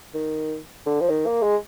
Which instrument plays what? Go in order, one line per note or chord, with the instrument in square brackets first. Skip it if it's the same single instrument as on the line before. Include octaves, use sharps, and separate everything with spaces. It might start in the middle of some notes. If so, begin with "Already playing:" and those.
[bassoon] D#3
D3
F3
D#3
A#3
G#3